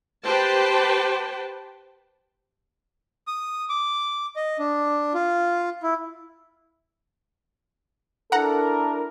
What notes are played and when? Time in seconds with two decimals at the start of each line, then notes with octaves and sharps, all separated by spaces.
0.25 G4 B4 C5 G5 A5
3.27 D#6
3.69 D6
4.36 D#5
4.59 D4
5.14 F4
5.83 E4
8.32 D4 E4 A4 A#4 F#5 A#5